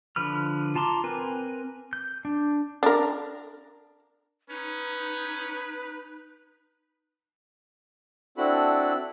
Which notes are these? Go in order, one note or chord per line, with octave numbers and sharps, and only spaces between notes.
D3 F3 B4 F6
F4 A5 A#5 C6 D6
C4 A#4 B4 G#5
G6
D4
D4 A#4
C#4 D#4 B4
C4 D4 E4 F#4 A4 B5